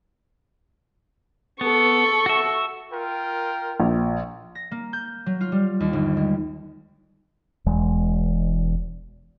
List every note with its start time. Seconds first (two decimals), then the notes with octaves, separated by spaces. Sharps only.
1.61 B3 A4 C#6
2.26 F#4 E5
2.92 F4 A#4 G5
3.80 A#1
4.55 A#6
4.71 A#3
4.93 G6
5.26 F#3
5.41 F4
5.52 G3
5.80 D#2
5.93 G1
6.17 G#3
7.66 E1 E2 G#3